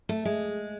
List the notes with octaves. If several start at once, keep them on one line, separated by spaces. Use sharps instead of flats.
A3
G#3